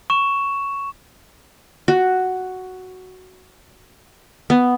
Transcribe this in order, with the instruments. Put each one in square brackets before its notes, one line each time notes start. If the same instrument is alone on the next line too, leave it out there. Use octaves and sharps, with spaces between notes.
[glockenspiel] C#6 E7
[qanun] F#4
B3